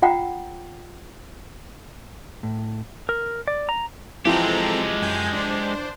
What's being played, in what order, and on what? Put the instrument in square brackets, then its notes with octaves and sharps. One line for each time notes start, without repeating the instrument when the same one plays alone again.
[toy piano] F4 F#5 G5 A#5
[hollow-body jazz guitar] A2
[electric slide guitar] A#4
D5
A#5
[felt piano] E3 F3 [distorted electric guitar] G#3 G4 [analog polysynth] C4 A4 A#5
[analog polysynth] F#2 G#5 G6
D4 C5